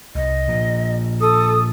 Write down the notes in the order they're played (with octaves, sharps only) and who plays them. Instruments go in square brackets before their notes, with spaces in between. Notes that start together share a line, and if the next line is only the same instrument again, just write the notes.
[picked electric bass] C2 [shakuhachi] D#5
[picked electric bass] A#2 F3
[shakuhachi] A4 [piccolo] D#6